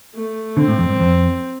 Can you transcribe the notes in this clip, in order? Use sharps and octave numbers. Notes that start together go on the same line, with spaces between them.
A3
D3 C4
A2
F2
G2
F2